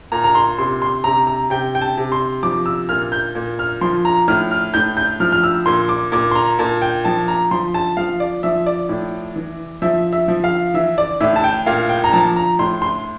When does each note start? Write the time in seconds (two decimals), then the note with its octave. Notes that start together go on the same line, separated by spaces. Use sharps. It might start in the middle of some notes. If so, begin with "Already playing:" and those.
0.12 A#2 A#5
0.24 A#5
0.35 C6
0.58 C3 C6
0.82 C6
1.04 C3 A#5
1.27 A#5
1.50 C3 G5
1.75 G5
1.81 A5
1.97 C3
2.12 C6
2.43 F3 D6
2.66 E6
2.89 A#2 F6
3.12 G6
3.35 A#2
3.59 F6
3.81 F3 C6
4.05 A#5
4.28 A2 F6
4.51 F6
4.74 A2 G6
4.97 G6
5.20 F3 F6
5.32 F6
5.44 E6
5.66 A#2 C6
5.89 D6
6.12 A#2 D6
6.31 C6
6.35 A#5
6.59 A#2 A5
6.82 G5
7.04 F3 A5
7.28 A#5
7.51 F3 C6
7.74 A5
7.97 F3 F5
8.20 D5
8.43 F3 E5
8.66 D5
8.89 A2
9.36 E3
9.82 F3 E5
10.13 E5
10.28 F3
10.44 F5
10.74 E3 E5
10.98 D5
11.21 A2 E5
11.36 A5
11.44 G5
11.66 A#2 F5
11.89 G5
12.04 A#5
12.13 F3 A5
12.36 A#5
12.59 A2 C6
12.82 C6